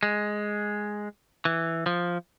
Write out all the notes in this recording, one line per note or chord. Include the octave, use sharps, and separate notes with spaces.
G#3
E3
F3